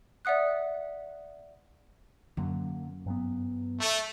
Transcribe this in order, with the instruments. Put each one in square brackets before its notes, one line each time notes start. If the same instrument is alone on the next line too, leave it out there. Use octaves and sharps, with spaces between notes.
[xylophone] D5 E5 F#5 D#6 F#6
[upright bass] F#2 [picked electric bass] D3 F#3 A#3
[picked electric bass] G2 F#3 B3
[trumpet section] A3